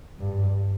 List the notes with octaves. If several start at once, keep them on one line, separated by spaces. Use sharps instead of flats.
G2